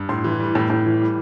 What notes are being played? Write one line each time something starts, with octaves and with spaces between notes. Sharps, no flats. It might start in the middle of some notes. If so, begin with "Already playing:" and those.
Already playing: G2
A2 C6
E3
G3
A2
A2
E3
G3